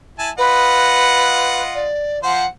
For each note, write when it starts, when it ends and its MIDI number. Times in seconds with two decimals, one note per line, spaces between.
0.19 0.30 64
0.19 0.30 80
0.19 0.30 81
0.38 1.89 65
0.38 1.62 71
0.38 1.89 75
0.38 1.89 78
1.75 2.22 74
2.23 2.43 53
2.23 2.43 72
2.23 2.46 78